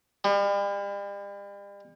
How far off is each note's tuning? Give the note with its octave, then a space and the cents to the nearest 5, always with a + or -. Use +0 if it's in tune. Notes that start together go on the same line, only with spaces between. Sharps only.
G3 +40